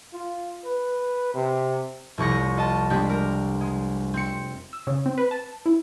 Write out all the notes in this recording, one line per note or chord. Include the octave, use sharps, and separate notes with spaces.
F4
B4
C3
F1 C2 C#6 A#6
F4 D#5 A5
G3 G#3 C4 D4 G4
A#4
G#3
C4 C#7
E6
C#3
C4
B4
A5
E4